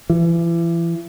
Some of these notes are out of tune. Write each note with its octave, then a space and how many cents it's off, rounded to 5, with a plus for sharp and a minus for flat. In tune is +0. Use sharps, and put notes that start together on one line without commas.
E3 +35